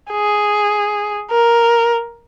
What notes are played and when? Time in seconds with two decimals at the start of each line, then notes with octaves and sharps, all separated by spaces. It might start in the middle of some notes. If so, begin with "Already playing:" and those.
0.12 G#4
1.31 A#4